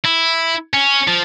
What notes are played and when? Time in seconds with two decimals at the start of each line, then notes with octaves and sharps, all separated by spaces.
0.04 E4
0.74 C#4
1.08 F3